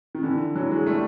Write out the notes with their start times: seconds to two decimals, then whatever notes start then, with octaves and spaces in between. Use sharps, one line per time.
0.15 D#3
0.23 D3 E3
0.55 E3 F#3
0.71 F#3 G#3
0.86 G3 A3